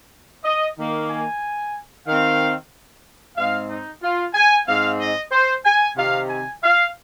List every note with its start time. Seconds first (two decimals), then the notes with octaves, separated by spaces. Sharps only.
0.44 D#5
0.77 D#3 A#3
1.10 G#5
2.07 D#3 C4 F5
3.37 G#2 G#3 C4 F5
3.70 D#4
4.02 F4
4.34 G#5
4.67 G#2 G#3 C4 F5
4.99 D#5
5.32 C5
5.65 G#5
5.97 C3 D#3 C4 F5
6.29 G#5
6.63 F5